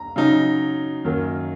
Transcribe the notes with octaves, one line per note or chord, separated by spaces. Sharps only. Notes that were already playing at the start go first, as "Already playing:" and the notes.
Already playing: A#5
C#3 F#3 D#4
F#2 D#3 F#3 A#3